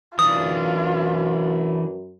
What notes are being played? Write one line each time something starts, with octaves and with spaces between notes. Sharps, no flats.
F#2 E3 D4 F4 D#6